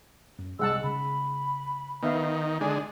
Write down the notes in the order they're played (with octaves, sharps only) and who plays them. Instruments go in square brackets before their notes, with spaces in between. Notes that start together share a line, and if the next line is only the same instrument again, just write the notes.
[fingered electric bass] F#2
[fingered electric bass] C2 C3 G3 [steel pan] G#3 F#5 A5 [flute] E6
[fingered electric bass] C#3 [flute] B5
[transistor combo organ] D#3 [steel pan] B3 E5 F5
[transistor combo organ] D3 G#3 [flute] G#5